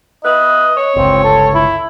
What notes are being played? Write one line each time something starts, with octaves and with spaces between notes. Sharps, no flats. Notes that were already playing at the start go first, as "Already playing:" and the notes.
B3 E4 B4 D#5
C#5
G1 C#2 C4
A4
E4